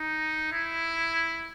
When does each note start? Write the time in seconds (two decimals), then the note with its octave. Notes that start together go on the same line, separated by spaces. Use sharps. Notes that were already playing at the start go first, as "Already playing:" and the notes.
Already playing: D#4
0.52 E4